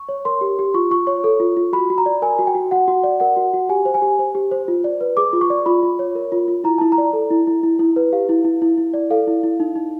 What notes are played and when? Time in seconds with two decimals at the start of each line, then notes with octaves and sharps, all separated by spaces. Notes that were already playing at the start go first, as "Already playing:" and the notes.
Already playing: C#6
0.09 C#5
0.25 A#4 C6
0.41 G4
0.59 G4
0.74 F4 C#6
0.91 F4 C#6
1.07 C#5 C#6
1.24 A4
1.40 F4
1.57 F4
1.73 F#4 B5
1.90 F#4
1.98 A#5
2.06 D5
2.22 A#4 G#5
2.39 F#4
2.47 G5
2.55 F#4
2.71 F#4 F#5
2.88 F#4
3.03 D5
3.20 A#4 F#5
3.37 F#4
3.54 F#4
3.69 G4 G#5
3.85 C5
3.94 G#5
4.02 G4
4.19 C5
4.35 G4
4.51 C5
4.68 F4
4.84 D5
5.01 B4
5.17 G#4 D6
5.33 F4
5.41 C#6
5.50 D5
5.66 F4 B5
5.83 F4
5.99 C#5
6.15 A#4
6.32 F4
6.48 F4
6.64 E4 A#5
6.78 E4 A5
6.92 A#5
6.98 D5
7.13 A4
7.30 E4
7.47 E4
7.63 E4
7.79 E4
7.96 B4
8.12 G4 F5
8.29 E4
8.44 E4
8.62 E4
8.78 E4
8.94 D5
9.10 A4 F5
9.27 E4
9.44 E4
9.60 D#4
9.76 D#4